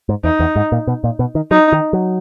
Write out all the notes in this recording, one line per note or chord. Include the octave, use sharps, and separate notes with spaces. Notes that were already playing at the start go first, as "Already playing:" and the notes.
G#2
E2 D#4
E2
G#2
A#2
B2
A#2
B2
D#3
F#3 D#4
D#3
F#3